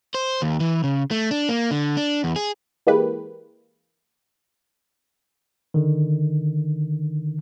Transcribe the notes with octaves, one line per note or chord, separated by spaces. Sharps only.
C5
D#2
E3
C#3
A3
D4
A#3
D3
D4
E2
G#4
E3 G#3 A#3 G4 B4
D3 D#3